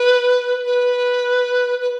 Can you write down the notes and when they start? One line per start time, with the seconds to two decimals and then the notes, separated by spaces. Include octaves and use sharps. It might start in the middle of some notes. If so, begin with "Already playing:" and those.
Already playing: B4
0.66 B4
1.81 B4